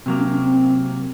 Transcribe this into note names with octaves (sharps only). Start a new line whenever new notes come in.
C3 F#3 A#3 C4
C#4
C#4
C4